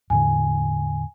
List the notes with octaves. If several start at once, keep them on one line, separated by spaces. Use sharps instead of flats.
E2 A2 D3 G#5